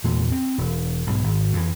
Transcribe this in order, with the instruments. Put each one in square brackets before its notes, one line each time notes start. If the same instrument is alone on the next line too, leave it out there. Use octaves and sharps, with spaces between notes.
[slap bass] E2 A#2 E3 G#3
C4
E1
B1 G#2
G#1
F2 E3